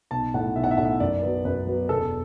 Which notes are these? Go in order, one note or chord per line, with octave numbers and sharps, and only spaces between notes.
B1 A5
A2 A3 F#5
B1 E5
F#5
E5
A2 A3 F#5
E5
F#2 D5
F#3 B3
F#2 B4
F#3 B3
E1 A4